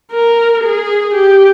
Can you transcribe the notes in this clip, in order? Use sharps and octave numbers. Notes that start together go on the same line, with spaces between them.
A#4
G#4
G4